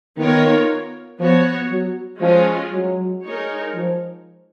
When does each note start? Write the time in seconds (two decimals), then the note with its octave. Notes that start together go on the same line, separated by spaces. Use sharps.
0.17 D#3 B3 F4 A#4 C#5
1.20 F3 B3 F#4 C#5
1.71 F#3
2.22 F3 G#3 C#4 F4 G#4
2.72 F#3
3.24 G#3 D#4 A#4 C#5
3.75 F3